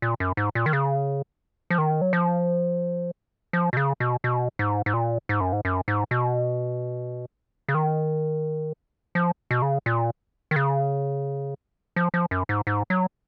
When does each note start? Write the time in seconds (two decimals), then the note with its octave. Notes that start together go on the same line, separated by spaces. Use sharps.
0.02 A#2
0.20 F#2
0.37 G#2
0.55 A#2
0.66 D#3
0.73 C#3
1.70 F3
1.78 D#3
2.01 F#3
2.13 F3
3.53 F3
3.73 B2
3.77 C#3
4.00 B2
4.24 B2
4.59 G#2
4.86 G#2
4.94 A#2
5.29 G#2
5.41 F#2
5.52 G#2
5.65 F#2
5.88 G#2
6.11 B2
7.68 C#3
7.74 D#3
9.15 F3
9.51 B2
9.62 C#3
9.86 A#2
10.51 D#3
10.56 C#3
11.96 F3
12.14 F3
12.31 F#2
12.49 G#2
12.67 G#2
12.90 F#3